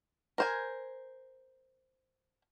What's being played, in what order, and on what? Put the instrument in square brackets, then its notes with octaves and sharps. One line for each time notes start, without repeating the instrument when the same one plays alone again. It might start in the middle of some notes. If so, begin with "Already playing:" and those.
[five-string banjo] A#4 C5 G#5